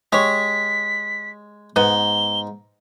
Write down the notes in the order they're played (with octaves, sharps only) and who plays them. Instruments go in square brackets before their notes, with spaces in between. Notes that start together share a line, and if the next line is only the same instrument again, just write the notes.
[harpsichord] G#3 [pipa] G4 C#5 [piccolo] B6
[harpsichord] G#2 [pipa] B3 [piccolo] G7